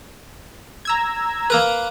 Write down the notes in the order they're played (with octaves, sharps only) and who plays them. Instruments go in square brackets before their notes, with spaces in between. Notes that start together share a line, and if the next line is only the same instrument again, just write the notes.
[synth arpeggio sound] A#5 E6 G#6
[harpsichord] A#3 A#4 B4